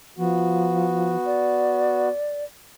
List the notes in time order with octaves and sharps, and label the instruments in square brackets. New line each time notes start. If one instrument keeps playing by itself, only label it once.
[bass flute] F3 [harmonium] B3 F#4
[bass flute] D5